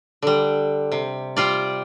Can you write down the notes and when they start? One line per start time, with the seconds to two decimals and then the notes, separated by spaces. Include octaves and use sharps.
0.22 D3 G3
0.92 C3
1.36 G3 F4 D5